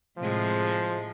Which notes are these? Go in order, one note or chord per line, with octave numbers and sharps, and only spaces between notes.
A2 C3 F3 G#3